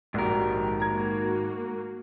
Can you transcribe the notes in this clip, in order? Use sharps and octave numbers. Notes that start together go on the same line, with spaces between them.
A#1 G#2 F#4 G4 A#4
A#3 F#4 A#5 G#6